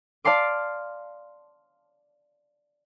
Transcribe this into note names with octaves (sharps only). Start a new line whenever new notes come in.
D5 F5 A5 C6 D6